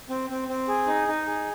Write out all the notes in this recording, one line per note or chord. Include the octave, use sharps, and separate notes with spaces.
C4
C4
C4
G#4
D#4
D#4
G#4